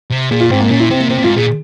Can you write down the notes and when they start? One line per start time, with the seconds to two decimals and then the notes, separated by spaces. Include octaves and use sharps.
0.11 C3
0.31 A#2 G#4
0.41 F4
0.51 G#2 C4
0.60 A#3
0.70 A#2 C#4
0.80 E4
0.90 C3 C4
1.00 A#3
1.10 C3 C4
1.18 A#2
1.23 G#2 F4
1.36 A#2 G#4